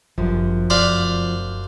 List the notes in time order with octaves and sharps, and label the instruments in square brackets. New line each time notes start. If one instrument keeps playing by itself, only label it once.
[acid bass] G1 [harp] F#2 [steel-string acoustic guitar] F3
[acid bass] F1 [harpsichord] C5 D5 F5 [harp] F#6 B6